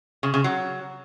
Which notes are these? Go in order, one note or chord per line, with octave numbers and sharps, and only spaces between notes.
C#3
C#3
F#3